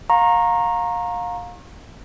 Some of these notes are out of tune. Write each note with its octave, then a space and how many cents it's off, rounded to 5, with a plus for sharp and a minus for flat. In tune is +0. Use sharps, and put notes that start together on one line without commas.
F5 +30 A#5 +0 C#6 -35